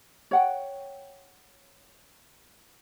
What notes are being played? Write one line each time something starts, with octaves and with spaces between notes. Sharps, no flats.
C#5 F#5 G5